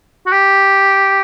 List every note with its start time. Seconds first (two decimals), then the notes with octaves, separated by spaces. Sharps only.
0.26 F#4
0.32 G4